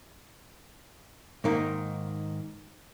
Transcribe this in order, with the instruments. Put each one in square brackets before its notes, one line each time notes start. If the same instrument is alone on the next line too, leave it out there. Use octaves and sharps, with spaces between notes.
[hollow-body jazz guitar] G#2 D#3 A#3